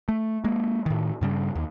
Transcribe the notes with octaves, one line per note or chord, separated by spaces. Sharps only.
A3
G#3 A#3
A2 D#3
G2 C#3 G3
D#2